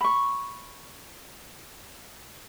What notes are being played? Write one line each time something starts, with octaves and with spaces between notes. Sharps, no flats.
B5 C#6